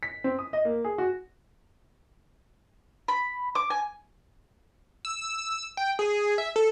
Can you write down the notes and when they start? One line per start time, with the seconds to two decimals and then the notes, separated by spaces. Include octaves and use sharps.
0.03 B6
0.24 C4
0.39 D#6
0.53 D#5
0.65 A#3
0.85 G#4
0.98 F#4
3.08 B5
3.55 D6
3.70 G#5
5.05 E6
5.77 G5
5.99 G#4
6.38 E5
6.56 A4